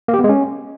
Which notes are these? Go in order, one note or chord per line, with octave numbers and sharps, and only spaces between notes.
A#3
G4
B3
G#3
C#4